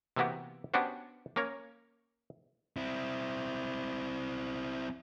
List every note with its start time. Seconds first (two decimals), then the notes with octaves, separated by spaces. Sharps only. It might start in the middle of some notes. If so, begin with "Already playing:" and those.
0.16 C3 E3 A#3 B3 F#4 G4
0.74 B3 C#4 D4 F#4 G4 C5
1.36 A#3 C#4 A#4 C#5
2.77 C4 E4